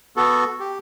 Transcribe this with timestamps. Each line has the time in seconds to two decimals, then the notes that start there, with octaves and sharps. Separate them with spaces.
0.16 B3 F#4 A4
0.60 G4